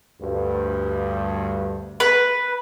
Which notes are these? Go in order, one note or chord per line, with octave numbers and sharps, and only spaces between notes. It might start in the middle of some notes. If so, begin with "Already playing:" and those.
D2 G2
B4